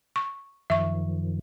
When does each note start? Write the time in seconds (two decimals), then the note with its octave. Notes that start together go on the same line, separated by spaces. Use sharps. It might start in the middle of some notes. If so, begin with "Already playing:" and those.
0.16 C#6
0.70 F#2 D#3 F3 E5 C#6